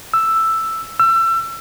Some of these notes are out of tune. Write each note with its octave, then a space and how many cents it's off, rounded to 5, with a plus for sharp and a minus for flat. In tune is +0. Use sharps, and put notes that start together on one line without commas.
E6 +5
E6 +30